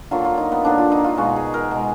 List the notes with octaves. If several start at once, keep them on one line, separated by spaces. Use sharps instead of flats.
D3 F#3 A#3 F4
F4
D#4
B3
D3 F#3 A#3 D4
F4
D#4
F4
B2 G#3 F#4
G#4
A#4
B2 G#3